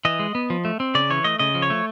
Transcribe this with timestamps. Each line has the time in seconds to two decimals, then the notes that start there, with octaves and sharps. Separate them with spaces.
0.05 E3 D#5
0.19 G#3
0.35 B3
0.50 F3
0.65 A3
0.80 C4
0.95 C#3 D5
1.10 E3 C#5
1.24 A3 D#5
1.39 C#3 D#5
1.55 F3
1.62 C#5
1.70 A3